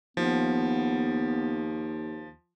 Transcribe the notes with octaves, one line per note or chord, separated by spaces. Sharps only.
D#2 F3 B3